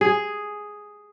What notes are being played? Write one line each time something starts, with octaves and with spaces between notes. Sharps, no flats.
G#4